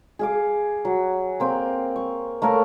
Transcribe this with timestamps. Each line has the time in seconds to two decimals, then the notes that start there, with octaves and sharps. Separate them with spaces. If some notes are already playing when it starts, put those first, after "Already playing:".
0.19 G#4 F5 D6
0.85 F#3
1.40 A#3 C4 G5
1.96 C#6
2.42 A3 A#3 A#4 C#5